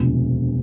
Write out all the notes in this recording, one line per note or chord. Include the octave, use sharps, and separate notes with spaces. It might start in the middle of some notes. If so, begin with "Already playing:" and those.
Already playing: E1 D2 C3 F3